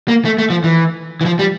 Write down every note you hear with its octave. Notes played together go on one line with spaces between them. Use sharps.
A#3
A3
A3
F3
E3
E3
F3
G3